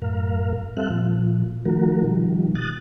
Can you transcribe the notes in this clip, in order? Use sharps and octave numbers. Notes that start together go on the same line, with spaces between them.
F#2 A2 A#4 F5
G3 C4 A4 E5 F5 F#6
A#2 F3
D#3 F3 A3 F#4 A#4
B2 D#3 F3 G3
D#6 F#6 A6